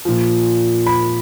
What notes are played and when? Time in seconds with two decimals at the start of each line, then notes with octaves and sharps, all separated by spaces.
0.05 A#2 F3
0.86 B5